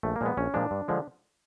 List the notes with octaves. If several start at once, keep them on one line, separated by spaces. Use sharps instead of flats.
A#1 A3
A#3
A#2 F3 G#3 B3
A#1 C#4
A#2 F3 G#3 D4
G2
D3 F3 G#3